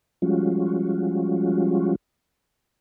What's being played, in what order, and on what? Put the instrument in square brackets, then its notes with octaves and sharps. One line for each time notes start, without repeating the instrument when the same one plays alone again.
[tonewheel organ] F3 G3 G#3 C#4 F4 F#4